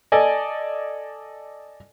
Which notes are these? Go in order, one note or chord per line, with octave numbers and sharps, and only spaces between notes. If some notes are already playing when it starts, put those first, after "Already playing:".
A4 D5 D#5 G#5